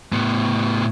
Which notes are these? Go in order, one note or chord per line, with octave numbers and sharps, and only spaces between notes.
A2 B3